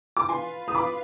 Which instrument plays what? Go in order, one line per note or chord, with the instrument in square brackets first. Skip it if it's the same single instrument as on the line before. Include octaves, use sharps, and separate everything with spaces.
[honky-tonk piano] D6
[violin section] F4 B4 F5 [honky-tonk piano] G#5 C6
[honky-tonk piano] D#6
B5 D6